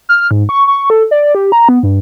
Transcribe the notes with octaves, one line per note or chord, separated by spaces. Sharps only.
F6
G#2
C#6
C#6
A4
D5
G4
A#5
B3
G2